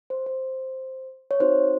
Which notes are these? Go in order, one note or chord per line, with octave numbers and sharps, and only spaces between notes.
C5
C5
C#5
C4 D#4 F#4 C5